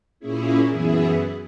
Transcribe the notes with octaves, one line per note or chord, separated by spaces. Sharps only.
A#2 A#3 C#4 E4 G#4
F#2 E3 B3 E4 G#4